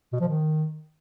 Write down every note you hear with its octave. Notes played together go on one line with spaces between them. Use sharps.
B2
F3
D#3